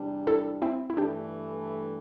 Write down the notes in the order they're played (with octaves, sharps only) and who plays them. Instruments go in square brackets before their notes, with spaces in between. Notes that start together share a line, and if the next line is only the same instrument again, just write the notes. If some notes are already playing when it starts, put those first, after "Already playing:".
Already playing: [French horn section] E2 C3 G3 D4
[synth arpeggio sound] E4 A4
C4 E4
E4
[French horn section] G2 E3 A3 [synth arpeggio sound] D4 G4